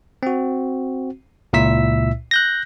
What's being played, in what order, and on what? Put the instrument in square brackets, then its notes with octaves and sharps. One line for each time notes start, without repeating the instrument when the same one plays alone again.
[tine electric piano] C4 F#4
C#2 A#2 E4 E5 E6 B6
F#6 G6 A#6